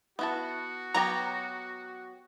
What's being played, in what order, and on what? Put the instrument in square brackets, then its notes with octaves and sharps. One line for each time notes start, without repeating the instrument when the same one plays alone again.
[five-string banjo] B3 E4 A5 [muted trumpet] F#4
[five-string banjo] F#3 B3 G4 [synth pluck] A#5